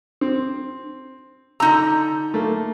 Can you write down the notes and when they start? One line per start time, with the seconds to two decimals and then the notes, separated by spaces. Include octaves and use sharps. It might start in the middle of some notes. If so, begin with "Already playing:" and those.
0.21 C4
1.60 D3 D#4 A#5 E6
2.34 A3 A#3